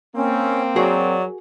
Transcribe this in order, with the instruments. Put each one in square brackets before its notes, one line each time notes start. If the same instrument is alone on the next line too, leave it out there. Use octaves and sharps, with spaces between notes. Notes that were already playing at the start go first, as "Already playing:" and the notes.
[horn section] A#3 C4 [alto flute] C#4
[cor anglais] F#3 [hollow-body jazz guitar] F#4 G#4 A#4 [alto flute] D5